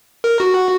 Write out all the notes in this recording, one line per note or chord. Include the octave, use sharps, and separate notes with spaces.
A#4
F#4